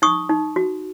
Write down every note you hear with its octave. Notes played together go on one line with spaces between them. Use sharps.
D#4 C#6 D#6
D#4
F#4